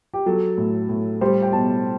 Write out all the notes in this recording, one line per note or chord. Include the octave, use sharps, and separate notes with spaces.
G4
F#3 A4
A2
A2
G3 C5
G5
B2 A5